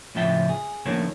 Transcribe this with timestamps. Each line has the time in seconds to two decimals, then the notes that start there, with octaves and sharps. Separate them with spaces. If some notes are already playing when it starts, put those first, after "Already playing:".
0.15 C#2 A2 C#3 F3 E5 G5
0.49 G#4
0.86 D#3 F3 A3 A#3 C#4 D4